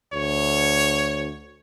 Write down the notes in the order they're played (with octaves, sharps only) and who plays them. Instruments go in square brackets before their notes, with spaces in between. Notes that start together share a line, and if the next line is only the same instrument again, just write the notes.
[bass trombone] D2 [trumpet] C#5